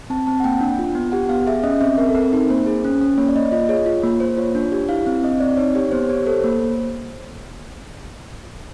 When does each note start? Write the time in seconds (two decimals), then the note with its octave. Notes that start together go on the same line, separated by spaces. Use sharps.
0.10 C4 A5
0.27 C4 A5
0.40 F#5
0.44 A#3 G5
0.61 D4
0.79 F4
0.95 B3
1.12 G4 F#5
1.29 B3 F5
1.47 G#4 E5
1.63 C#4 D#5
1.81 C4 E5
1.98 C4 A#4
2.08 A4
2.15 C4 A#4
2.33 D#4
2.50 A#3 C5
2.66 G#4
2.84 C#4
3.01 C#4
3.18 A#3 C#5
3.28 D5
3.36 A#3 D#5
3.52 F4 D#5
3.69 G#4 C#5
3.86 F4
4.04 A#3
4.20 A#3 C5
4.37 F4 C#5
4.55 D4
4.72 G4
4.89 E4 F5
5.06 C4 F5
5.23 C4 D#5
5.40 C4 D5
5.57 D#4 C#5
5.75 G4 C#5
5.92 B3 C5
6.09 G4 C#5
6.26 A4 C5
6.44 A#3